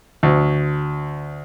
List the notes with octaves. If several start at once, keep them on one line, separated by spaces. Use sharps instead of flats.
D2